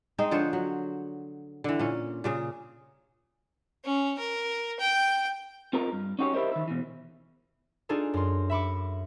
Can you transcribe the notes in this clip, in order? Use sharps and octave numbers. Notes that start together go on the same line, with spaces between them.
G#3 C4 D#4 G#4
D3 F3 C5 C#5
F#3
D3 E3
A#2 C#4
A#2 C#3 G#4
C#4
A#4
G5
C4 F4 A#4 B4 D#5 A#5
G2
C#4 D#4 F#4 G4 C5 C#5
E4 G4 A#4 C5 D#5
D#3 E4
B2 E3
D4 D#4 F4 G#4 A4
F#2 C6
E5 B5 C#6 D6